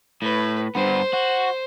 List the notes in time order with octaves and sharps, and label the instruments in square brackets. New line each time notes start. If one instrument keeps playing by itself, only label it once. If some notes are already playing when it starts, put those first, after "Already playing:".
[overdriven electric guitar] A2 [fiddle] B4
[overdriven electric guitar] G2 B3 [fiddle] C5
[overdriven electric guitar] F#4